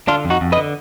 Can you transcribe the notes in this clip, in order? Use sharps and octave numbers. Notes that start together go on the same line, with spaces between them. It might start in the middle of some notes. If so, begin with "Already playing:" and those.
D3 D4 F4
F2
D#4 F#4
F2
B4 D#5
D3